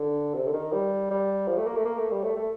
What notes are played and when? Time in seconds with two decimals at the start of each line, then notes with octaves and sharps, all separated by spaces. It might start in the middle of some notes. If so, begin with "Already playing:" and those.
Already playing: D3
0.34 C3
0.47 D3
0.53 D#3
0.73 G3
1.11 G3
1.48 F3
1.57 A3
1.67 A#3
1.77 A3
1.85 A#3
1.98 A3
2.11 G3
2.24 A3
2.36 A3